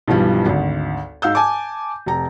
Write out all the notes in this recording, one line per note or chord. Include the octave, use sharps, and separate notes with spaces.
B1 G2 E3 F3 G3
G#1 D2
G#2 F5 E6 G6
G#5 A5 D6
F1 A#5